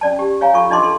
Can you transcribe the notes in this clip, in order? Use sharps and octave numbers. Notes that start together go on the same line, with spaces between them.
C#4 D5 A5
G4
C#5 F5 G#5 A#5
F4 A4 C#6
D4 D#4 D#5 A5 C6 D6
A4 C6